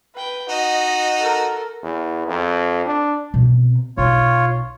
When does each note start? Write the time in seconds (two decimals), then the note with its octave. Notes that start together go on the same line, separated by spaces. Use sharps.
0.15 B4 G5
0.49 D#4 F#4 D#5
1.19 A4 A#4
1.83 E2
2.27 F2
2.86 D4
3.34 B2 C4
3.97 B1 F4 C#5